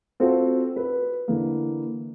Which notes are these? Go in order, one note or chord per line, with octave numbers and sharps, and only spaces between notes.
C4 F4 F#4 A4 C5
B4
D3 E3 A#3